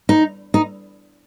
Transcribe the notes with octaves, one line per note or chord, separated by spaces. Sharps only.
D#4
D#4